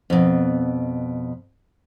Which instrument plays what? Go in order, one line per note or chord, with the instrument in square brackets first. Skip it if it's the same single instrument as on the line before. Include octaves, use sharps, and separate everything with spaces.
[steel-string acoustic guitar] F2 B2